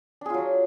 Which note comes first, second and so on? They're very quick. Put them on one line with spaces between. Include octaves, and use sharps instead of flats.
D4 G#4 F4 F#3